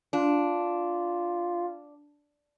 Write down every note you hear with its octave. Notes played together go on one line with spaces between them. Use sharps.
D4 F4